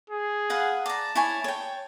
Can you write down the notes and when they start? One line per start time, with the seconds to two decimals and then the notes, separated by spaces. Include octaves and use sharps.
0.10 G#4
0.50 B4 F5 F#5
0.86 D5 A5 A#5
1.15 E4 C#5 G#5
1.44 C#5 G5